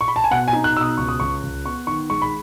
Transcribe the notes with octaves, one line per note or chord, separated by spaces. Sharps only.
C#6
B5
A5
G#5
B2 F#5
G#5
D#4
F#6
B2 D#6 E6
C#2 C#6
D#6
C#2 C#6
C#2
B3 C#6
D#3 C#6
G#3 C#6
B5